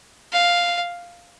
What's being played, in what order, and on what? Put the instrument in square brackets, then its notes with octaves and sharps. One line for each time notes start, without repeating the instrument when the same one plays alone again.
[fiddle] F5